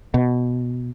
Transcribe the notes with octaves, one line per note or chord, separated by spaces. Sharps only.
B2